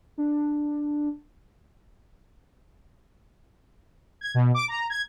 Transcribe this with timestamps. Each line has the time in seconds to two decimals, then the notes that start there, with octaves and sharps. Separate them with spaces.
0.18 D4
4.21 G#6
4.34 B2
4.54 D6
4.68 A#5
4.90 G#6